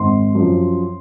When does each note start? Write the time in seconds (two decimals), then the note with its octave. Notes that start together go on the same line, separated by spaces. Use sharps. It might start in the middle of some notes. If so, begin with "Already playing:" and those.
Already playing: G#1 C6
0.35 F#2 F3